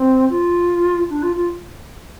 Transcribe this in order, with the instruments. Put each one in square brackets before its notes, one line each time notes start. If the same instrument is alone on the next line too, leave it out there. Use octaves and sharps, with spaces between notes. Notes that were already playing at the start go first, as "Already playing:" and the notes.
Already playing: [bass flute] C4
F4
D4
F4
F4